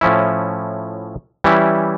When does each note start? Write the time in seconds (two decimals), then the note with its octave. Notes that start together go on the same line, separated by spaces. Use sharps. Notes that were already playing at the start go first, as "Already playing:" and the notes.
0.01 A2 F3 C#4 E4
1.44 E3 G3 C#4 E4